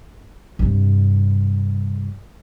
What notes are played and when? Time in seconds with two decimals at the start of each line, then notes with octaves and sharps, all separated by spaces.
0.59 G2 C3